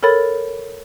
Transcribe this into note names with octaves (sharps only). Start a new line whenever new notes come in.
A4 A#4 C#5 B5 A6